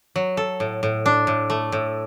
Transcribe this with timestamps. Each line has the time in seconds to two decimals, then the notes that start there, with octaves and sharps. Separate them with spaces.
0.16 F#3
0.37 A4
0.60 A2
0.83 A2
1.06 D4
1.27 A2
1.50 A3
1.72 A2